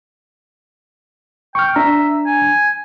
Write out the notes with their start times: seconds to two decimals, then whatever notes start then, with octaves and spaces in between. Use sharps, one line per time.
1.55 G5 C#6 F6
1.76 D4 E5 A#5
2.27 G#5